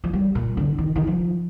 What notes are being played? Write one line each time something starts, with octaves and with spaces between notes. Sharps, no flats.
F3
G3
A#2
D3
D#3
D#3
F3